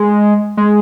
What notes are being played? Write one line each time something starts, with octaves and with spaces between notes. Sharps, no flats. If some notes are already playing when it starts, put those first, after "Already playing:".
Already playing: G#3
G#3